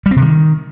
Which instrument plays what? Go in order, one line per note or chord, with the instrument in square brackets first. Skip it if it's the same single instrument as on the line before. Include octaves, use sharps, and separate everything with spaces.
[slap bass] G3
C4
C3
D#3